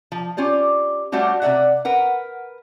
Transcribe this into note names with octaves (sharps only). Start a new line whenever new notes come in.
F3
C#4 F4 G4 D5
G3 A3 C#4 F#4 G4
C3 C4 D5 E5 F#5
A#4 B4 F#5